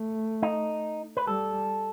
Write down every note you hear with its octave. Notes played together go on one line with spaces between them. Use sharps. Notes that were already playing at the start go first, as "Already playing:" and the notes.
Already playing: A3
D#4
B4
G3 A4